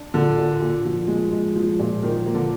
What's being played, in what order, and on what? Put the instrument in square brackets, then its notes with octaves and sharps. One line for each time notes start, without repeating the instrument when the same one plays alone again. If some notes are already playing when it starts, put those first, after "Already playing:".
Already playing: [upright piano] D4
[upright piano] A#2 [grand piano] D3
[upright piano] A#2
A#2
F3
G#3
G#3
F3
A#2
[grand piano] D#3 [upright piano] F3
[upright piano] A#3
[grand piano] D3